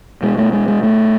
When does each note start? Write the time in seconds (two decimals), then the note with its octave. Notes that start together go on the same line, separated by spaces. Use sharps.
0.23 B2 G#3
0.38 A3
0.53 G#3
0.68 G#3
0.83 A3